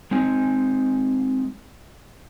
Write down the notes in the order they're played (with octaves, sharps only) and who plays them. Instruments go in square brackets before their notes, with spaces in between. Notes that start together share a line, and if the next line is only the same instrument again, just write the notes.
[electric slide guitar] G#3 C4 D#4 G#5